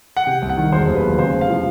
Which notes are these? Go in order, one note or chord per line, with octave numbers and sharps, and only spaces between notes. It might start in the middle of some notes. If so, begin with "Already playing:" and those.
F#5
C3 G5
C2
F#5
D#3
E1 C5
D#2
B4
F#3
C#3 C5
F1
F5
F3